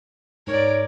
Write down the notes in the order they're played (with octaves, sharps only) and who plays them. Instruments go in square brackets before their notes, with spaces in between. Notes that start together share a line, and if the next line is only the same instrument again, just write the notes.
[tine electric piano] G#2 C#6 [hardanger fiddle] A#4 D5 [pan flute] C#5